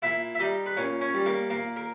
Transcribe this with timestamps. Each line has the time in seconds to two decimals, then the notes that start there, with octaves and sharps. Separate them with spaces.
0.02 A#2 E4 E5
0.35 E5
0.39 G3 D#4 D#5
0.66 B4
0.77 A#2 C#4 C#5
1.01 C#4 C#5
1.14 G3
1.26 A#3 A#4
1.50 A#2 A#3 A#4
1.76 A#4